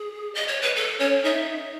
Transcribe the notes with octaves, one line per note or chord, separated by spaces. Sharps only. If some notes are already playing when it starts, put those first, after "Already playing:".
Already playing: G#4
D#5
C#5
B4
A4
C#4 C#5
D#4 E5